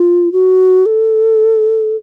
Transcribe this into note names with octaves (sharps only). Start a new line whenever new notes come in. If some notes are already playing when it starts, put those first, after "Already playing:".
Already playing: F4
F#4
A4